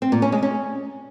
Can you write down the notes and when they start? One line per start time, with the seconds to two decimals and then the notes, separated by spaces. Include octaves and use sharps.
0.02 C4
0.12 A#2
0.22 C#4
0.32 G#3
0.42 C#4